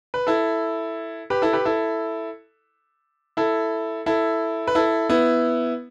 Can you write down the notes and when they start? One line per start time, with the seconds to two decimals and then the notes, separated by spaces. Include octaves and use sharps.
0.14 B4
0.27 E4 A4
1.30 G4 B4
1.42 E4 A4
1.53 G4 B4
1.65 E4 A4
3.37 E4 A4
4.06 E4 A4
4.67 B4
4.75 E4 A4
5.09 B3 E4